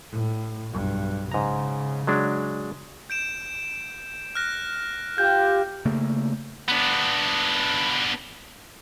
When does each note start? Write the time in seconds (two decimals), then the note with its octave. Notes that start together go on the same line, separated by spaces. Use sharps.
0.11 A2
0.71 B1 G2
1.32 G#2 C#3 A#5
2.07 F#3 G#3 D4
3.10 G6 D7 E7
4.35 F6 F#6 A#6
5.18 F4 G4 G6
5.85 C#3 A3 A#3
6.69 B3 D4